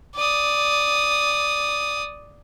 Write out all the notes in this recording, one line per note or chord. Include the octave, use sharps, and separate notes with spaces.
D5 D#6